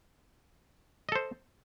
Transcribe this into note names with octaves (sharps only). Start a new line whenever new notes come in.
A4 C5 D#5